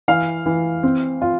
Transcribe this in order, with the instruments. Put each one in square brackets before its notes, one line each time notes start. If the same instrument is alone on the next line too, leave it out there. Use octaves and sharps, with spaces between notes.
[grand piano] E3 F5
E3
C4
F4